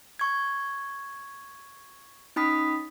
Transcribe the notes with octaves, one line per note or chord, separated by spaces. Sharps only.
C#6 G#6
C#4 D#4 B5 D#6 B6